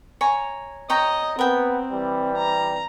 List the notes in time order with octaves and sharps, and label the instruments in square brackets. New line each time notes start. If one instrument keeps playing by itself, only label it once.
[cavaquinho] C#5 G#5 A#5
[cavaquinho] C#5 G5 A#5 [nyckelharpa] D#5
[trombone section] B3 [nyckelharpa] C4 [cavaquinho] A#4 G5
[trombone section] E3 G3
[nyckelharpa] A#5